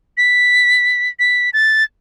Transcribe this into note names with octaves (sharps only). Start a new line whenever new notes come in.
B6
B6
A6